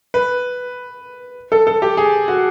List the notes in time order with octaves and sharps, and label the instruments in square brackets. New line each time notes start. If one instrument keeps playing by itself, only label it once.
[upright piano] B4
A4
A4
G4
G#4
F#4